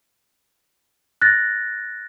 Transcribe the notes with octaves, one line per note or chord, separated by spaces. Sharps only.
F#6 A6 A#6